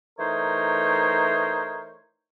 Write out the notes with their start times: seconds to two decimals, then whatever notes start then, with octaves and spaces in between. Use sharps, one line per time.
0.18 E3 A3 D#4 A#4 C5 C#5